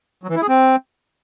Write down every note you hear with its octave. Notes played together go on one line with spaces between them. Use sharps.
F#3
E3
E4
G#4
C4